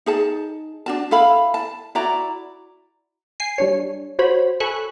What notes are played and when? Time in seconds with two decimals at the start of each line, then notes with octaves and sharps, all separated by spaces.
0.06 D#4 G#4 A5
0.86 D4 F#4 A5
1.11 E4 A4 F5 B5
1.54 A5
1.95 E4 F#4 D5 A#5
3.40 G#5 C7
3.58 G3 D4 C#5
4.19 F#4 C5 C#5 B5
4.60 A4 G#5 B5 C#6 E6 F#6